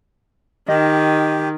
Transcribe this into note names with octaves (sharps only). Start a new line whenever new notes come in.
D#3 G4 D#5